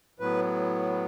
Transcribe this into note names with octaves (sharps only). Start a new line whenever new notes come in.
A2 F#3 B3 B4